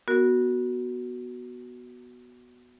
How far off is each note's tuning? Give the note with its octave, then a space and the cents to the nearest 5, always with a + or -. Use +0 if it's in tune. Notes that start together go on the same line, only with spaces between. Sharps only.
B3 -10 F#4 +0 A#4 -5